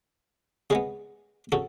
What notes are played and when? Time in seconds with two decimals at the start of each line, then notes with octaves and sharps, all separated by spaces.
0.70 C#3 G#3 B3 G#4 B4
1.52 C#3 F#4 A4